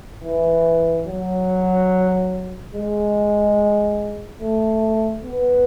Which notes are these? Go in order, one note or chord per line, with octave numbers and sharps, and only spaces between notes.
E3
F#3
G#3
A3
B3